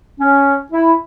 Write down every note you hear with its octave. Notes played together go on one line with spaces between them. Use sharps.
C#4
E4